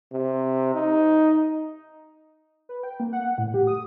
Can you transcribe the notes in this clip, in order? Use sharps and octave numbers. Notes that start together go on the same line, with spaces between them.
C3
D#4
B4
G5
A#3
F#5
F#5
A2
G4
D#6